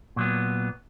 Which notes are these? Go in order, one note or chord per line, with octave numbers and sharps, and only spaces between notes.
A#2 F#3 B3